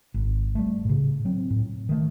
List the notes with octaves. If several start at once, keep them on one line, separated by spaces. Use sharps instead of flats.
G#1
G3 A3
A2 C#3
F#3 C4
A2
D#3 A3